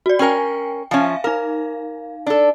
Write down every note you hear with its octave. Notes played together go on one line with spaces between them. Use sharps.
F#4 D5
C#4 A#4 G5 G#5
F3 C#4 E5 F5 G#5
D#4 A#4 F5
D4 A4